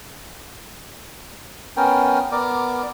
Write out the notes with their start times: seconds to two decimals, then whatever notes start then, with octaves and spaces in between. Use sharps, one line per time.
1.77 B3 C#4 A#4 G5
2.32 B3 A#4 D5 D6